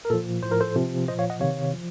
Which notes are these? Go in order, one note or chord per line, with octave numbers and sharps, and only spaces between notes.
A#4
A#2 F3 A4
A2 F3 C5
A#4
A4 C5
C3 F3
A#2 F3 C5 D#5
C#5 F5
D#5 F#5
C3 D#3 C#5 F5
F3